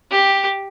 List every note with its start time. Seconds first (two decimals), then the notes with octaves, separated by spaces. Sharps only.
0.12 G4